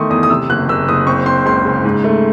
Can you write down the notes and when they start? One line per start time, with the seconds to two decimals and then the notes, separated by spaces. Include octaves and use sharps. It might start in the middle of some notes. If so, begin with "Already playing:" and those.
Already playing: E2 D#3 A3 C6 C#6 D#6
0.10 E2 D#6
0.23 D#6
0.30 C3 E6
0.50 F#1 F#6
0.69 F#1 E6
0.88 F#1 D#6
1.07 C4 C#6
1.26 C4 C6
1.45 C#2 C6
1.65 C#3
1.84 G#2
2.04 A3